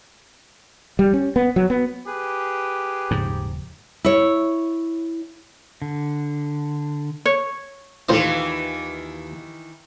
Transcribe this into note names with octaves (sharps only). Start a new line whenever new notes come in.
G3
C#4
B3
F#3
B3
G4 G#4 B4
D#1 G#2 C#3 F3
E4 C#5
D3
C#5
D#2 A2 D#3 E3 F4 C5 D#5